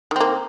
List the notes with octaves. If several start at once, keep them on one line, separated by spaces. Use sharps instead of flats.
D#3 A#3 C4